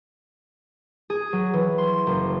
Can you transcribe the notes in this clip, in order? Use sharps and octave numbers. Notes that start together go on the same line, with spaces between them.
G#4
F#3
E3
C6
F#1